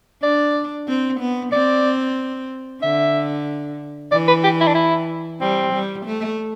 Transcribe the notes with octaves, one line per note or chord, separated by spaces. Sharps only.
D4 D5
C4
B3
C4 D5
D3 E5
E3 D5
B4
G4
E4
D4
E4
G3 C4
G3
A3